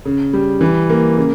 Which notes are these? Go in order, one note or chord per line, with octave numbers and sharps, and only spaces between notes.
C#3
G3
E3
A#3
C#3